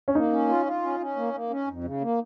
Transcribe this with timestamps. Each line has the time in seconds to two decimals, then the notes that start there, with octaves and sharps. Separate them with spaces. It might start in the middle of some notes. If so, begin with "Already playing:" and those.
0.08 C#4
0.15 A#3 D#4
0.32 C#4
0.49 F4
0.66 F4
0.82 C#4
1.00 C#4
1.16 A#3
1.34 A#3
1.50 C#4
1.68 F2
1.84 C#3
2.01 A#3